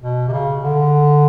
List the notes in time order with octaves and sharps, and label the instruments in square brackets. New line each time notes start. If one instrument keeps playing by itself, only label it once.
[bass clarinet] B2
C3
C#3
D3